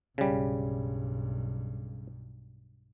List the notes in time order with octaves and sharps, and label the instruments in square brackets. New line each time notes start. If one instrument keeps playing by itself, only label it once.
[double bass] B1 G2 [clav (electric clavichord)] C#3 G3